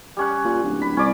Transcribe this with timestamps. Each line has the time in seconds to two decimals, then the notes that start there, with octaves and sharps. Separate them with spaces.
0.17 G3 C#4 F#5
0.45 A#2
0.63 D1
0.82 B5
0.97 C2 C#4 D5